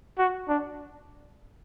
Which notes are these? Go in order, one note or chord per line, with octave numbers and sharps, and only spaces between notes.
F#4
D4